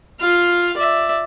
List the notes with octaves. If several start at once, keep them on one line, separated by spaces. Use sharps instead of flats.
F4 F5
D5 E5